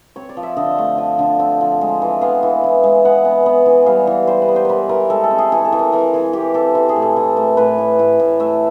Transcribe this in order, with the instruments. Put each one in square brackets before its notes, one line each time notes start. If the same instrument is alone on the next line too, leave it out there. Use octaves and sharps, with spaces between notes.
[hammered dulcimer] C4 C#5
D5
F3
E5
D3 D#5
A3
F3
D3
C4
F3
G#3
E3
B3 F5
E3
E3
G#3
B3 F#5
B3
B3
E3
G3 F5
E3
G3 C5
B4
B3
C5
E3 A#4 B4
E3 A#4
G#3 A4
A4
C4
G#4
E3 G#4
A4
E3
A#4
E3 A#4
E3 G#4
C4 G4
C4 A4
E3
G#4
A2
A4
E3
A3 A#4
A2 B4
A2
A2
A2
A3 E5